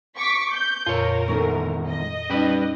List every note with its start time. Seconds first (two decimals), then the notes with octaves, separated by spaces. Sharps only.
0.16 C#6 D6 B6
0.52 G6
0.86 F2 A#2 F4 A#4 C#5
1.28 E2 G#2 D#3 A4 A#5 C#6
1.88 D#5
2.30 G3 C#4 D#4 G4 B4